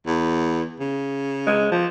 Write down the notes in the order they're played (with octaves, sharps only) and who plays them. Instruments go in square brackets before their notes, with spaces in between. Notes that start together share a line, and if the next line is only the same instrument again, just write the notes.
[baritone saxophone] E2
C#3
[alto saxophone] G#3
F3